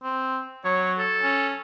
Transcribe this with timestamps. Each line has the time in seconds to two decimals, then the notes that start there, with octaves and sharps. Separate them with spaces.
0.03 C4
0.65 F#3 C#5
0.98 A4
1.23 C#4